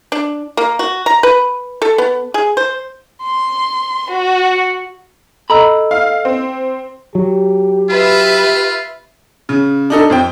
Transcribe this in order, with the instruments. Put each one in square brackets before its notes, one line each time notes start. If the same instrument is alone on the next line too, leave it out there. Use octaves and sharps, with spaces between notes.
[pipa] D4
A#3
F#4
A#5
B4
A4
B3
G#4
C5
[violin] C6
F#4
[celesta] A4 D#5 E6 [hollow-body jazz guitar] A#5 B5
[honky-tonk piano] F5
C4
[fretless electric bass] F#3 [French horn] G4
[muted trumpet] F4 [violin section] B4 E5
[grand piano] C#3
D4 D#4 A4
F2 C4 G5